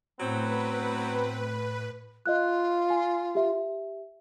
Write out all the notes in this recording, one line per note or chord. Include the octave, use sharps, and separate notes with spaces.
A2 F#3 B3 C4 B4
F4 D#5 F5 F#6
G#5
G4 E5